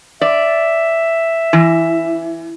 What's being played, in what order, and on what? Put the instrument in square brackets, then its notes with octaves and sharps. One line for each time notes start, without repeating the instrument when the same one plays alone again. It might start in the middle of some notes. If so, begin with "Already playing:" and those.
[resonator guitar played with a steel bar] D5 [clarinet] E5
[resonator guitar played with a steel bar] E3